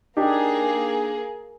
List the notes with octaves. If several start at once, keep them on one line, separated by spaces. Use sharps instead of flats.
A#3 D4 D#4 G4 G#4